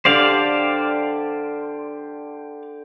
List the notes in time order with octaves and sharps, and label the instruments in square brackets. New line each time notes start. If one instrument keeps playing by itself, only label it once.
[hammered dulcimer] D3 G4 [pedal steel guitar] C5 D5 F5